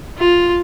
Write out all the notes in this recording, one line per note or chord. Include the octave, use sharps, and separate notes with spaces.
F4